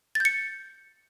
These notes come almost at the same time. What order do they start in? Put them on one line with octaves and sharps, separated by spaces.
A6 G6 C#7